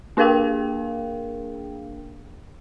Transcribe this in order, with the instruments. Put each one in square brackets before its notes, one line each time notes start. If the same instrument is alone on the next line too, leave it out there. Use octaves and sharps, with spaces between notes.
[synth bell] A#3 D4 G#4 A#4 F5 G5